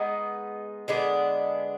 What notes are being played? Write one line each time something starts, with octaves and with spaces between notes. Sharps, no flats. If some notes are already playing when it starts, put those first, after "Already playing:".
Already playing: G#3 B3 D#4
D3 G#3 B3 D4